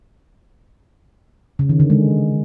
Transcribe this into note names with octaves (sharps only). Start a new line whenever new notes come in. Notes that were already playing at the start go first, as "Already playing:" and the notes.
C#3
D#3
D3
G#3